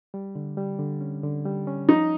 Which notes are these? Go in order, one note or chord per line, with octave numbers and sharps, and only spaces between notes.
G3
D3
G3
D3
C#4
D3
G3
C#4
F3 D#4